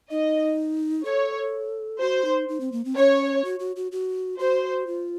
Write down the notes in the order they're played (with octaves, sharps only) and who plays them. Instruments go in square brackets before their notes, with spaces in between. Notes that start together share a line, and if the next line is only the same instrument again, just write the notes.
[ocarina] D#4 [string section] D#5
[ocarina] A4 [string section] C#5
[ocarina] F#4 [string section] C5
[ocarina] D#4
D#4
C4
A#3
C4
[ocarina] C#4 [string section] C#5
[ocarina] F#4
F#4
F#4
F#4
[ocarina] F#4 [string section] C5
[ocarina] F4